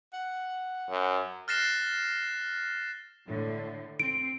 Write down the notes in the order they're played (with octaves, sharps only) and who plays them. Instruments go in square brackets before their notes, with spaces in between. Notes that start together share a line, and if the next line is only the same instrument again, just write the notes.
[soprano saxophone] F#5
[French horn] F#2
[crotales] F6 F#6 A6 A#6 C7 E7
[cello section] A2 D3
[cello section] C4 [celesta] D7